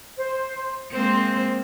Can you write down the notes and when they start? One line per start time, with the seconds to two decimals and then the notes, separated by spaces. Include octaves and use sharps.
0.17 C5
0.91 G#3 A#3 C4 C5